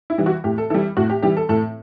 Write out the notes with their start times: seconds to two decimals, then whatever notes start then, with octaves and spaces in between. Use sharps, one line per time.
0.10 E4
0.18 E3 G3
0.26 F#4
0.44 A2 G4
0.58 A4
0.70 E3 G3 A4
0.97 A2 F#4
1.10 G4
1.22 E3 G3 G4
1.37 A4
1.49 A2 A4